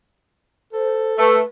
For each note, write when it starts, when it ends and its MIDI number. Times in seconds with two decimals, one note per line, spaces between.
0.73 1.34 69
0.73 1.14 72
1.18 1.39 57
1.18 1.42 71